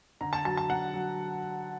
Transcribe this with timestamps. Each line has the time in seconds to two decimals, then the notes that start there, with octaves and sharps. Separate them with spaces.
0.21 D3 A#5
0.33 A5
0.45 F#3 A5
0.57 A5
0.69 D3 F#5
0.94 F#3